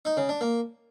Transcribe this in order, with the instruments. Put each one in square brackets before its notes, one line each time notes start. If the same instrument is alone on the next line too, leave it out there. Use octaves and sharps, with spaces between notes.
[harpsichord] D#4
C#3
D4
A#3